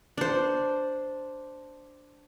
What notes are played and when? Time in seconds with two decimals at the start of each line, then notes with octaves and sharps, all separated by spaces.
0.18 D4 C5